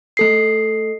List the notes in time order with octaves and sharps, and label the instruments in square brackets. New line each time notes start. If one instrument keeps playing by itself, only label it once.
[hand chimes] A3 A4 C7